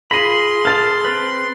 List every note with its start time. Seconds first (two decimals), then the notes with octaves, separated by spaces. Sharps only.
0.11 F4 G#4 B5 C6 A#6 D#7
0.65 A4 F6 A6 F7
1.05 C4 B4